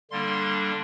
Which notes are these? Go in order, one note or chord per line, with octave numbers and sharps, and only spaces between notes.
D3 G3 A#3 D4 C6